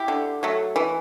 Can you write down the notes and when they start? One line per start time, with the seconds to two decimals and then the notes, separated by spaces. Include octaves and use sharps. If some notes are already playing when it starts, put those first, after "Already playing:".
Already playing: E4 G4
0.08 D3
0.43 F#3 A3
0.76 E3